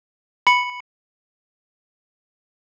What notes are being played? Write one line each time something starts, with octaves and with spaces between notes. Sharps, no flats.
B5 C#7